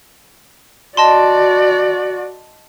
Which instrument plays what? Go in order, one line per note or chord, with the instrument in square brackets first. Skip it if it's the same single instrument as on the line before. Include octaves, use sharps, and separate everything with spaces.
[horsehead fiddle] F#4 D5 [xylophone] D#5 A5 C6